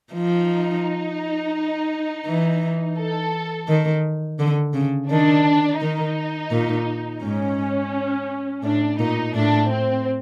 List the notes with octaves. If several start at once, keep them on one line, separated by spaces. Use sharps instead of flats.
F3 D#4
E3
A4
D#3
D3
C#3
D#3 D4
D#3 D#4
A#2
G#2 C#4
A2 D4
A#2 D#4
A2 D4
C4